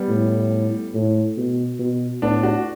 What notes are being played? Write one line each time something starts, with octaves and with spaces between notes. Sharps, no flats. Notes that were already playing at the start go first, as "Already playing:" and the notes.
Already playing: G3 B3
A2
A2
B2
B2
A2 B3 D4
D4 F#4